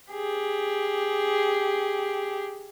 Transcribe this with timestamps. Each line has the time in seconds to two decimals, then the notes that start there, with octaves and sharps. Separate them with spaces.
0.11 G4 G#4